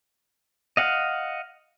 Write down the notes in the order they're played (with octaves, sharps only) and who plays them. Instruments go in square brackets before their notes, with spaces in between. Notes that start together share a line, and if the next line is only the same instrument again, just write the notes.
[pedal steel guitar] D#5 F5 F#5